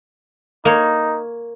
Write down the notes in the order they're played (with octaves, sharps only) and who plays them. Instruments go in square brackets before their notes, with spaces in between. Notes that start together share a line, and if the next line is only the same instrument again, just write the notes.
[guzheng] A#3 C#5 [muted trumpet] D#4